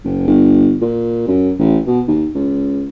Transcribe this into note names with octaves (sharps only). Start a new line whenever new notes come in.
F#1
G1
A#2
F#2
A1
B2
D#2
C#2